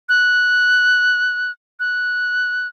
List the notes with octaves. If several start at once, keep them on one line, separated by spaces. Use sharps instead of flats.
F#6
F#6